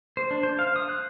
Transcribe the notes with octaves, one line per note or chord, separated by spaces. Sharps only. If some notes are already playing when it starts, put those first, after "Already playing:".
C5
D4
C5
F5
D#6
F#6